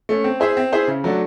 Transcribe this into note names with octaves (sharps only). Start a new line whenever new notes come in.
A3 C#4
C4
E4 G#4 C5 E5
C4
E4 G#4 C5 E5
C#3
F#3 A3 D4 F#4